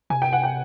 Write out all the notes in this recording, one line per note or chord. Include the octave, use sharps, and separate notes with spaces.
C3 G#5
G5
F#5
G5